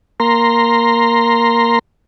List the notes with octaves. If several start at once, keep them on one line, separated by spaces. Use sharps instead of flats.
A#3 A#5 C6